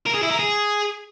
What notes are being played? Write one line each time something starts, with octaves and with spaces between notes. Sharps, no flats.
A#4
G#4
E4
A#4
G#4